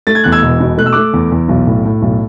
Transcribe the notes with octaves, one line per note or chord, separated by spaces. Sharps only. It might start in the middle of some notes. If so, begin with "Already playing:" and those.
A3 A6
G#6
E2 F#6
E6 G#6
E1
B2
A3 F#6
E6
A3 D6 F#6
E2
E2
B1
A2
A2
B1